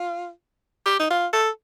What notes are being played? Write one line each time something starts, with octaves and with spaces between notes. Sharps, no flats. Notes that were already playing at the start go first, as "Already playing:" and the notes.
Already playing: F4
G4
D#4
F4
A4